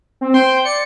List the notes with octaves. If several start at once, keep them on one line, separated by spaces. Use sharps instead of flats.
C4
C5 G5 C6
D5 C#7